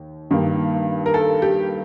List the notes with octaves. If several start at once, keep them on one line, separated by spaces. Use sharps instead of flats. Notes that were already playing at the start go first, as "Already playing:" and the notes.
Already playing: D#2
G2 D#3 A#3
A#4
A4
G4